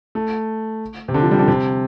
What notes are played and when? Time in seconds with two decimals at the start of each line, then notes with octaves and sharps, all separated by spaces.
0.15 A3
1.08 C3
1.14 D3
1.22 F3
1.31 G3
1.39 D3
1.48 C3